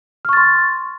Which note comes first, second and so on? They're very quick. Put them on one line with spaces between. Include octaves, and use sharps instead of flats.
F6 C#6 A6 C6